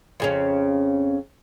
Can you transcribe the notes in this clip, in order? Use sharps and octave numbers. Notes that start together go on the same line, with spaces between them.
F2 C#3 C#4